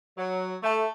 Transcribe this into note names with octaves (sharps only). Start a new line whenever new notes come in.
F#3
A3